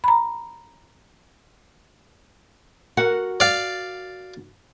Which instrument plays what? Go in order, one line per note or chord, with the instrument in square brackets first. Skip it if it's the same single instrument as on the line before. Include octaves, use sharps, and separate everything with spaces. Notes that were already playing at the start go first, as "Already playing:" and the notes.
[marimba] A#5 B5
[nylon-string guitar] F#4 A#4 F#5
[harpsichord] D5 F5